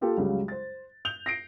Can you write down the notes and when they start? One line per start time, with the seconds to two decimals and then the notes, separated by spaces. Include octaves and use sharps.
0.01 A#3 F4 G4 A4
0.17 C#2 C#3 F#3 G3
0.48 C5 A6
1.05 G6 F7 G7
1.26 A#6 C7 D7